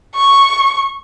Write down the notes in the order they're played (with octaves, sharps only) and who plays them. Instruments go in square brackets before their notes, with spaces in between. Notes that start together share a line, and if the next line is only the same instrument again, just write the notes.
[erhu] C#6